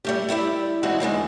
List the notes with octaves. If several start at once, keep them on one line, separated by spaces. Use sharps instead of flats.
G3 A3 G4
G3 E4 D5 E5
E3 G#3 C4 D#4 E4 F#4
E2 G#2 D3 G#3